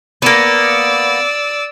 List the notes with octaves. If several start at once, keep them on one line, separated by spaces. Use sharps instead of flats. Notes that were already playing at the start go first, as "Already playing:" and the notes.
A#3 B3 D5 E6